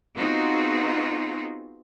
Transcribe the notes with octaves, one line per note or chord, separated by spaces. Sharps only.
B3 C4 D#4 F4 F#4 G#4